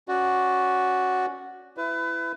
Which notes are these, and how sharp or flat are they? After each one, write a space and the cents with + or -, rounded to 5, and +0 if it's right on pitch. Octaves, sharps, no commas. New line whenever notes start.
C#4 +0 F#4 +0 D5 -5
E4 +20 B4 +30